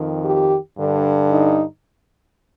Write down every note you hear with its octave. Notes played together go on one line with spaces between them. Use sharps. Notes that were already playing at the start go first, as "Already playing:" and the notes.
Already playing: F2 D#3
G4
G2 D3
D#4